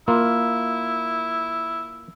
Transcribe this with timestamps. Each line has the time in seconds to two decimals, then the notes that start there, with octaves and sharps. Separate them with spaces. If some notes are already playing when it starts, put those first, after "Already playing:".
0.08 A#3 E4 F4